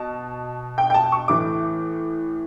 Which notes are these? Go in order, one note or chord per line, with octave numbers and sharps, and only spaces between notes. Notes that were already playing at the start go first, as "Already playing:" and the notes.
Already playing: B2 A5
G5
G5
A5
C#6
A2 E3 D6